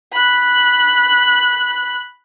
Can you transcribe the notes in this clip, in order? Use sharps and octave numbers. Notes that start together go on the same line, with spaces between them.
B5 F#6